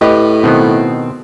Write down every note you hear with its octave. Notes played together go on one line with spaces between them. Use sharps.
A2 G4 B4 D#5
B2 D#3 B3 C4